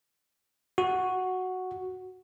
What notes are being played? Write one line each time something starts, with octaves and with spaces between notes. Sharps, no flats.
F#4